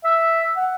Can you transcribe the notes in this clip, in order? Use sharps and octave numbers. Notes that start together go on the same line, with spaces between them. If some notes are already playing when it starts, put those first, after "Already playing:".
E5
F#5